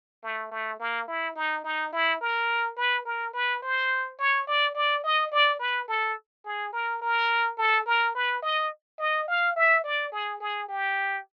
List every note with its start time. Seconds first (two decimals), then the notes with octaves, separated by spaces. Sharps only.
0.23 A3
0.52 A3
0.80 A#3
1.08 E4
1.36 D#4
1.64 D#4
1.93 E4
2.21 A#4
2.77 B4
3.05 A#4
3.34 B4
3.62 C5
4.19 C#5
4.47 D5
4.75 D5
5.04 D#5
5.32 D5
5.59 B4
5.88 A4
6.45 G#4
6.73 A#4
7.02 A#4
7.58 A4
7.86 A#4
8.15 B4
8.43 D#5
8.99 D#5
9.28 F5
9.56 E5
9.84 D5
10.12 G#4
10.40 G#4
10.68 G4